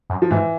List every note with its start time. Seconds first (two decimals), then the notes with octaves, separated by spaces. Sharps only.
0.10 F#2
0.22 F3
0.30 G#2 E3